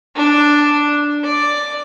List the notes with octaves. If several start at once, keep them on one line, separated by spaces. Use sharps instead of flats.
D4
D5